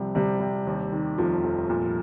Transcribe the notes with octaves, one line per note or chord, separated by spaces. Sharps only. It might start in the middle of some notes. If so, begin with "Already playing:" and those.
Already playing: C2 C3 F3 G3
C3 G3
C3
D#2
D#3
F1 F3
F1
A#2